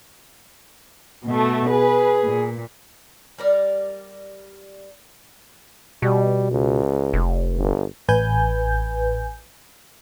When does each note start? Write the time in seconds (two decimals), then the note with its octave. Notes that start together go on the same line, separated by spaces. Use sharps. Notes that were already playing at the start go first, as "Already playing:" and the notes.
1.25 B2 A3
1.69 G#4 B4
2.23 A#2
3.38 G3 A#4 D5
6.02 B2 G3
6.51 C#2
7.13 F1
7.57 G1
8.08 A1 B4 G#5 G6